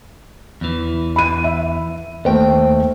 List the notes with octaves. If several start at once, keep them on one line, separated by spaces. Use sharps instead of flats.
E2 E3
B5 D#7
E5
D#2 A3 C5 G5